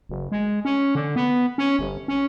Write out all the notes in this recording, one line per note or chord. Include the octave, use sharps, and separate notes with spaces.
F#1
G#3
C#4
D3
B3
C#4
G1
C#4